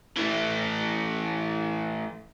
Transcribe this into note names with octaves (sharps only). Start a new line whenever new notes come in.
E3 A3